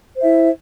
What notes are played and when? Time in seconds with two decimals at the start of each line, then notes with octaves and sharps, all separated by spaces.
0.15 C5
0.20 E5
0.24 E4